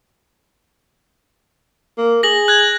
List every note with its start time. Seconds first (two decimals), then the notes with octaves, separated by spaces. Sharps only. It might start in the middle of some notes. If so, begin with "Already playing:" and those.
1.97 A#3
2.23 G#4 A#6 F#7
2.48 F#6 G#6